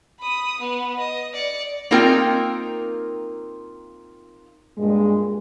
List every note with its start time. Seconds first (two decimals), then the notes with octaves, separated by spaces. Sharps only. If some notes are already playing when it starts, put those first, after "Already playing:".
0.20 B5 D#6
0.58 B3
0.98 D#5
1.33 D5 C#7
1.91 A#3 C4 D#4 F4 A#4 G5
4.78 G2 A#2 G#3